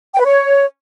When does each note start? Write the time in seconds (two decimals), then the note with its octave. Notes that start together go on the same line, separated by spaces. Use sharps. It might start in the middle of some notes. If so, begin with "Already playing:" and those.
0.14 G5
0.19 B4
0.25 C#5